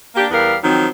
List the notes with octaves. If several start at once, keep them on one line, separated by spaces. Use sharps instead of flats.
A#3 D4 G4
E2 G3 B3 A#4 F5
D#3 F3 F#3 C4